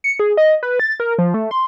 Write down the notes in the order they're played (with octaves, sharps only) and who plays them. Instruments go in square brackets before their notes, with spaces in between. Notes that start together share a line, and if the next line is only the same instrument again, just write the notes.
[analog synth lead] C#7
G#4
D#5
B4
A6
A#4
F3
A3
C6